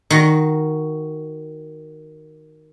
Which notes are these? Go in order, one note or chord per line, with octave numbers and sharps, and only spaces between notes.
D#3 F#4